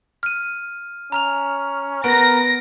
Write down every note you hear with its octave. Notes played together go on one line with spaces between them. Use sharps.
F6 D#7
C#4 A#5 F6 F7
B3 A#4 A#6 D7